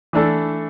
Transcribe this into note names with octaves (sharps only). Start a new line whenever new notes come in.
E3 A3 D4 A4